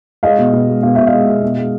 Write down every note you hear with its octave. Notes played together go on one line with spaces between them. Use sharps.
G#3 D#5 F5
B2
B2
G#3
B2 F5
B2 E5
D#5 F5
G#3
B2
B2
G#3